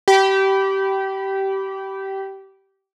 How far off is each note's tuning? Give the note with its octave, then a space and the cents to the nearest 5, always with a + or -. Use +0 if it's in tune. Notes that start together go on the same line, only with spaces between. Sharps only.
G4 -20 B5 +0